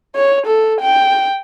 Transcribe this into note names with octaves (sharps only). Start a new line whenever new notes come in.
C#5
A4
G5